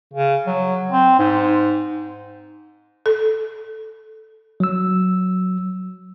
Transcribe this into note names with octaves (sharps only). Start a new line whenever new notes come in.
C#3
F#3
C4
G#2
A4
F#3 E6